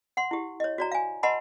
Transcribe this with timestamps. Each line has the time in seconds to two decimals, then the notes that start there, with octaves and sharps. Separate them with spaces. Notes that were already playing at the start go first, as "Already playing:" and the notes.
0.17 F#5 C6
0.31 E4 G4
0.60 C#5 D#5
0.78 F#4 D5 A#5
0.92 F5 G#5
1.23 B4 D#5 F#5 A5 B5 C6